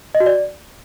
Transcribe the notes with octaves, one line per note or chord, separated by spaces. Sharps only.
D#5
F#4
D5